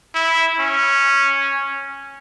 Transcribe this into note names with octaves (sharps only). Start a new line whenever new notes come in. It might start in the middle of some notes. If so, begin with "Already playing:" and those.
E4
C#4